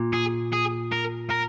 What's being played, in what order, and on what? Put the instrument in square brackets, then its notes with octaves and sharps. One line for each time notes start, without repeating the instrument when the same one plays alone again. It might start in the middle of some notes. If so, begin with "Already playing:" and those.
Already playing: [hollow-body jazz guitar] A#2
[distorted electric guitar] G#4
G#4
A#4
A#4